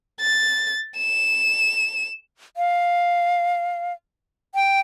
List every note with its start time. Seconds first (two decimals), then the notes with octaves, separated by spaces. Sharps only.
0.20 A6
0.98 E7
2.57 F5
4.55 G5